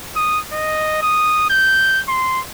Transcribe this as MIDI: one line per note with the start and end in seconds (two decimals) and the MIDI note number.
0.16 0.39 87
0.53 0.99 75
1.02 1.49 87
1.50 2.00 91
2.08 2.41 84